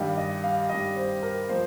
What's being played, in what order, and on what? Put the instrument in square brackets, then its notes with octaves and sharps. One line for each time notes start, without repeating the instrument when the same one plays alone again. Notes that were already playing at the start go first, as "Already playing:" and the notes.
Already playing: [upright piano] G2 D#3 G3 [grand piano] F5
[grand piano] D#5
F5
[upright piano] G2 D#3 G3 [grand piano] D#5
[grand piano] C5
A#4
[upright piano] F3 A#3 F4 [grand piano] C5